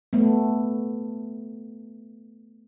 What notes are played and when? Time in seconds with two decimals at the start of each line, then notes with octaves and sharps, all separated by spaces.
0.13 A3 B3